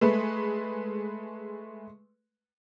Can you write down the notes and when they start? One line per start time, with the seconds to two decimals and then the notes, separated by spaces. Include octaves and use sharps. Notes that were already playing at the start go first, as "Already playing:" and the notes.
0.01 G#3 A3 B4